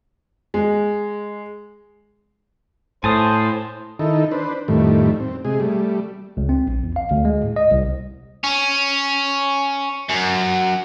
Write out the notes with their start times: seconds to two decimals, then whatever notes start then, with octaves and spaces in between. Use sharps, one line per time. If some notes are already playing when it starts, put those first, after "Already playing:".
0.54 G#3
3.04 A2 C5 G#5 A5 D#6
3.99 D#3 D#4 E4 A4
4.31 D4 B4 C5
4.68 F2 A2 D#3 G3 A3
5.20 C4
5.45 C3 G#3 G#4
5.60 G3 A3
6.37 C#2
6.49 C4
6.67 A#1
6.83 E2
6.96 F5
7.11 D2
7.25 G#3
7.43 A2
7.56 D#5
7.71 C2
8.44 C#4
10.09 F#2